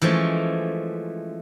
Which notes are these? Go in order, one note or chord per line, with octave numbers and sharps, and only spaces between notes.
E3 F3 G#3 A3 C#4